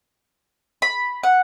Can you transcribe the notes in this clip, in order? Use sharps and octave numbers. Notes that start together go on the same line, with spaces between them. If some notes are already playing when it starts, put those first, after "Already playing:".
B5
F#5